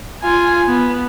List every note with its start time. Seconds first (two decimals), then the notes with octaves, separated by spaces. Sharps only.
0.23 F4 G#5
0.67 B3